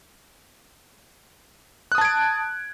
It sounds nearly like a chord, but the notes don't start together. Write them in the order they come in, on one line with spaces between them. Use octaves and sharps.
F#6 D#6 A5 G#6 D7